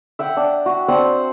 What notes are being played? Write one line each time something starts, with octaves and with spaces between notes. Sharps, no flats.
E5 F#5 G5
D4
F#4
C4 D4 C5 F#5